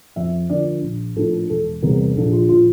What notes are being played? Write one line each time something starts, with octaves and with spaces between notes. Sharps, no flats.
F2 E5
D3 F3 A#3 D5
A#1
A2 F3 A#3 D4 A4
E1 A4
E2 C3 G3 A#3 A#4
A#1 A4
F4
A#2 F3 F4